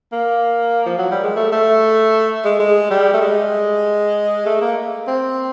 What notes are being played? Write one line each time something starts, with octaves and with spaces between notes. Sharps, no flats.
A#3
F3
F#3
G3
G#3
A3
A3
G#3
G#3
G3
A3
G#3
A3
A#3
C4